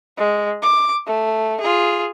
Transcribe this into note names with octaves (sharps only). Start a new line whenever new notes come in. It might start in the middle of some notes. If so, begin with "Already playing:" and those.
G#3
D6
A3
F4 G#4